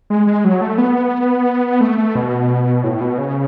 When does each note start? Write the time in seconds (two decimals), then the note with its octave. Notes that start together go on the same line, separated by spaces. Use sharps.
0.10 G#3
0.27 G#3
0.44 F#3
0.61 A3
0.78 B3
1.81 A3
1.98 A3
2.15 B2
2.84 A2
3.01 B2
3.18 C#3